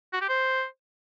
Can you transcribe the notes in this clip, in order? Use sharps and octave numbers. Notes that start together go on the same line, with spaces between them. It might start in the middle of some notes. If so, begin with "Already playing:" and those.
F#4
G4
C5